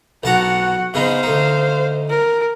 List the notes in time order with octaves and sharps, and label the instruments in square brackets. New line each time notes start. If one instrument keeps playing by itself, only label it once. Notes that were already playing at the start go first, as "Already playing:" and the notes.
[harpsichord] B1 A5 A#5 [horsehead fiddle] F#4 F#5
[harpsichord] C#3 B3 D#4 [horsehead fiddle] C5 F5
[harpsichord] D2 D#4
[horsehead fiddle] A#4